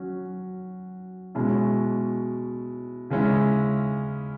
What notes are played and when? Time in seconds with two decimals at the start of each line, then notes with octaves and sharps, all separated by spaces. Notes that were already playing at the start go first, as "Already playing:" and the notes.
Already playing: F#3 C#4 F#4
1.35 B2 G#3 C#4 E4
3.10 C#3 G#3 C#4 E4